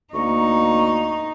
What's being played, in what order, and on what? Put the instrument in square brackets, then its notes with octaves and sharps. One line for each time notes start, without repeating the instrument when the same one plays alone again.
[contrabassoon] D2 [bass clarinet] A#3 [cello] D#4 [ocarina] C#6